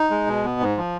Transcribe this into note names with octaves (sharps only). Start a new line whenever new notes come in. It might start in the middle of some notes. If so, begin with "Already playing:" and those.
Already playing: D#4
G#3
B2
B3
G#2
F3